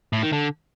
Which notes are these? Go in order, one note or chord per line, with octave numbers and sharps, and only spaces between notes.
A2
D#3
D3